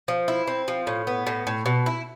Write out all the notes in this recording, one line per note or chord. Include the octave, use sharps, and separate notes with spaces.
F3
E4
C4
F3
A2
B3
A2
A2
B2
E4